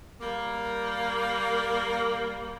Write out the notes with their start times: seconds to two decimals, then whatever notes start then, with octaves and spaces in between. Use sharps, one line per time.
0.20 G3 A#3